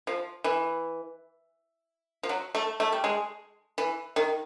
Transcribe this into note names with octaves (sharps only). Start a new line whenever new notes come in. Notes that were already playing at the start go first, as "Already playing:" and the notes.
F3
E3
F3
F#3
A3
A3
G3
G#3
E3
D#3